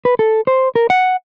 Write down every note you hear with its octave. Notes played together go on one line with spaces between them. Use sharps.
B4
A4
C5
A#4
F#5